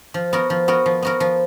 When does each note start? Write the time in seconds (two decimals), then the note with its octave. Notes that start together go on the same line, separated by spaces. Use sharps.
0.14 F3
0.33 B3 F#4 A#4
0.50 F3
0.68 B3 F#4 A#4
0.86 F3
1.02 B3 F#4 A#4
1.20 F3